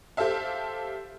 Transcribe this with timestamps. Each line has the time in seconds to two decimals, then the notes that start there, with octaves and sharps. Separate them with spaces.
0.17 G4 A4 C5 E5 F5